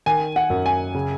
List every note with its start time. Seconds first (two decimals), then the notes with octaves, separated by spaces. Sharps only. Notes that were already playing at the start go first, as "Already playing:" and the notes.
0.06 D#3 G#5
0.36 F#5
0.50 F#2
0.66 G#5
0.95 C#3